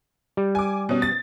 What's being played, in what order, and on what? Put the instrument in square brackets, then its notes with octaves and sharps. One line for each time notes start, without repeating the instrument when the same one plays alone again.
[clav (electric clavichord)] G3
[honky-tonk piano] G#5 D6
B2 C#4
A6